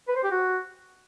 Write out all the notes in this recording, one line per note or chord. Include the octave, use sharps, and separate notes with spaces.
B4
C5
G4
F#4